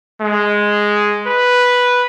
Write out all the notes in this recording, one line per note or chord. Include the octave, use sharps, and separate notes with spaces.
G#3
B4